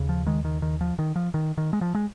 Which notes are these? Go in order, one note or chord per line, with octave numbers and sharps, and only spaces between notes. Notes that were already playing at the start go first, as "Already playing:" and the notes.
Already playing: D#2 C#3
F3
D#3 G#3
D#3
D#3
F3
D#3
F3
D#3
D#3
G#3
F3
G#3